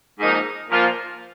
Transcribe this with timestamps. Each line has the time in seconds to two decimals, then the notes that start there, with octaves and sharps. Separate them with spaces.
0.20 G#2 F3 A#3 D#4
0.70 A#2 F3 A#3 F4